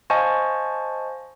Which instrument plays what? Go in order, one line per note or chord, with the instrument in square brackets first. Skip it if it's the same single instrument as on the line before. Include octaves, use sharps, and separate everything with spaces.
[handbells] C5 D#5 F5 G#5 A5 C#6